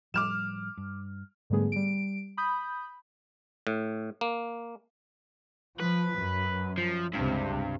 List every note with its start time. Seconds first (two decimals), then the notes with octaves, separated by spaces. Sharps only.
0.14 A2 F3 G3 D6 F6 E7
0.77 G2
1.50 G#2 D3 G3 A3 B3 G#4
1.72 G3 D7
2.37 B5 D#6 G6
3.67 A2
4.21 A#3
5.80 F3 B4
6.17 F#2
6.78 F3
7.13 C#2 G2 C3